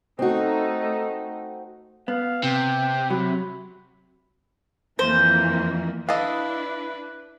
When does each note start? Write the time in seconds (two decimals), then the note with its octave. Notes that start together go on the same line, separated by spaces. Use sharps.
0.19 A3 C4 D#4 F#4
2.08 B3 F5
2.43 C3 G5
3.10 F#3 B5
4.99 F2 E3 A#3 C5
6.09 D4 E4 A4 B4 D#5 F5